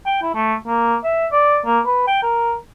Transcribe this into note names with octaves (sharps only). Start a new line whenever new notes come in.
G5
E4
A3
A#3
E5
D5
A#3
B4
G5
A#4